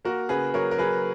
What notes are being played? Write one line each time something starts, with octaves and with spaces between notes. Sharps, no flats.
A#3 F#4 A#4
C#3 G#4 B4
F#3 A#4 C#5
A#4
F#3 G#4 B4